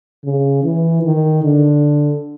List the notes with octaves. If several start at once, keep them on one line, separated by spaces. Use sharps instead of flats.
C#3
E3
D#3
D3